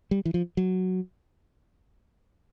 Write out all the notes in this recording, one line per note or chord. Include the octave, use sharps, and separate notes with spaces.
G3
E3
F3
F#3